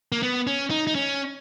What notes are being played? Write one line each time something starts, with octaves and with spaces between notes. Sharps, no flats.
A#3
B3
C#4
D#4
D#4
C#4